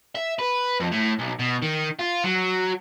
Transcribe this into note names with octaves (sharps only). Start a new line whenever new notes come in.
E5
B4
F2
A2
B1
B2
D#3
F4
F#3